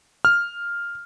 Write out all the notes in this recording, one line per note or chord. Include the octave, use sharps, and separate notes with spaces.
F6